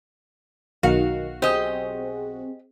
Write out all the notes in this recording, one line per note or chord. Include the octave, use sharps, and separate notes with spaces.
B1 D#3 F#4 F5
C4 G4 G#4 D#5